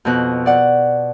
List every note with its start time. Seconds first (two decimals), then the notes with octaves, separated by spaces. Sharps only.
0.05 F2 B2 F#6
0.46 D5 F#5